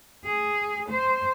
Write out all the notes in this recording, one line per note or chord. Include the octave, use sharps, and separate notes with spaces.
G#4
C5